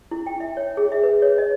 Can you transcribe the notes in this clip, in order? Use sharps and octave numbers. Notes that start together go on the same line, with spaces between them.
E4
G5
E5
C#5
G#4
E5
B4
C#5
D#5